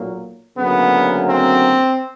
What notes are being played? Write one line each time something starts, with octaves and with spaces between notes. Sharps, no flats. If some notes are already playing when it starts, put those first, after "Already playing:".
Already playing: B1 A#2 F#3 A#3
D2 C#3 F#3 A#3 B3
C4